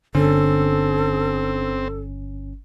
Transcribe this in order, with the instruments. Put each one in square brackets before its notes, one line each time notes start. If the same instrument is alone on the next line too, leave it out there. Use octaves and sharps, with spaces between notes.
[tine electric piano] G1 C#4 [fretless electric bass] D3 [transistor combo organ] C4 [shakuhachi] A4